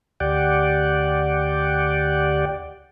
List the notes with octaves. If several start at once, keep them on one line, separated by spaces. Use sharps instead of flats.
D2 G4 D5 F#5 G5